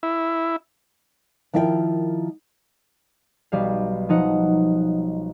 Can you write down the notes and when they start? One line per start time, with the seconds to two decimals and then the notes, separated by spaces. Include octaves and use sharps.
0.03 E4
1.54 D#3 F3 E4 A#4 E5 G5
3.52 B1 G3 F5
4.09 F3 D#4 F#5